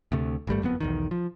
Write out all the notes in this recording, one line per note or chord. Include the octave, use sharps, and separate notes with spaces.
D2 C3 A3
G#1 G2 G3 A3
F#1 F2 C#3 B3
B1 E2 D#3
F3